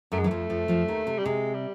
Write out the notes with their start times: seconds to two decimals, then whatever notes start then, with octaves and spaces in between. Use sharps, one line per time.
0.12 F#2 F#3 A3
0.19 G#3
0.24 E3
0.28 F2 F3 A3
0.50 F2 F3
0.68 F2 F3
0.88 D#2 D#3
1.07 C3
1.18 G3
1.25 C3 G#3
1.54 G3